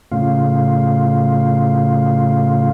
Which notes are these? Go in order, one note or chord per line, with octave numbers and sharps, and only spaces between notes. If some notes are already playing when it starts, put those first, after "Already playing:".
A2 C#3 F4